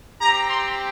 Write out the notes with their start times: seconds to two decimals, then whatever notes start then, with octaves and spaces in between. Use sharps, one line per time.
0.21 C4 G4 A#5
0.49 C6